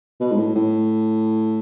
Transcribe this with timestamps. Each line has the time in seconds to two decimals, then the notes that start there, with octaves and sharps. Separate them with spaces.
0.20 B2
0.32 G#2
0.37 A2
0.55 A2